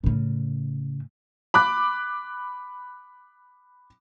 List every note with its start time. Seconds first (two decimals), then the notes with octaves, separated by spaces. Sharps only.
0.04 A2 C#3
1.54 B5 D6 F#6